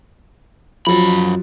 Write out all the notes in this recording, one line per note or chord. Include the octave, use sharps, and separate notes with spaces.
F#2 F3 F#3 B5